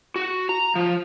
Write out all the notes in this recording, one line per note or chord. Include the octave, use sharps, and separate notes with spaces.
F#4
A#5
F3